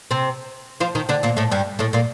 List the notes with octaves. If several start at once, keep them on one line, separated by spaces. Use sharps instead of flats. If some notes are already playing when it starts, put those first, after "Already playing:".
C3 C4
F3 F4
D#3 D#4
D3 D4
A#2 A#3
A2 A3
G2 G3
A2 A3
A#2 A#3